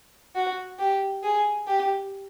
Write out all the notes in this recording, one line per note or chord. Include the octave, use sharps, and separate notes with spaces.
F#4
G4
G#4
G4